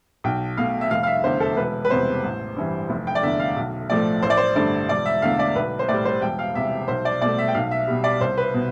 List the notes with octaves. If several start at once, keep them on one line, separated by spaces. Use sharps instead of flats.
B1 G5
B2 A3 F5
E5
F1 F5
F5
E5
E2 D3 C5
A4
E1 B4
B4
E2 C3 G3 C5
A1
G2 E3 G3
F1
G5
D5
E2 D3 E5
F5
B1
A2 F3 A3 D5
A1 C5
D5
C5
G2 D3 A3 D5
E1 D5
E5
E2 D3 A3 F5
D5
B1 B4
C5
A2 G3 D5
C5
E1 G5
F5
E2 C3 G3 E5
B1 C5
D5
B2 A3 D5
E5
G5
B1 F5
E5
B2 G3
D5
C2 C5
B4
B2